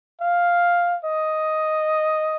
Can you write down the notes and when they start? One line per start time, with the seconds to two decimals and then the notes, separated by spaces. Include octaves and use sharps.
0.21 F5
1.05 D#5